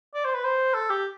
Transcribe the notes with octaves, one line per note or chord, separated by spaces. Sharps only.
D5
C5
B4
C5
A4
G4